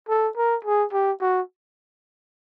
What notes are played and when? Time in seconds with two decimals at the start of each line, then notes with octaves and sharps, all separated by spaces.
0.09 A4
0.37 A#4
0.65 G#4
0.93 G4
1.21 F#4